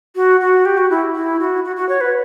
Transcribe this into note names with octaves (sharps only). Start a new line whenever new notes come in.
F#4
F#4
G4
F#4
E4
E4
F#4
F#4
F#4
C#5
B4